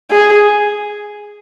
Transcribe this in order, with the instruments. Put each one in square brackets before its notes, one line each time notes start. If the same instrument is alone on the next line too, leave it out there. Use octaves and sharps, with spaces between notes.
[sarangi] G#4